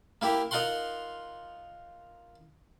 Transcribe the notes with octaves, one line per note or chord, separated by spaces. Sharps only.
A#3 E4 G4 A#4
D#4 F4 A#4 F#5 C6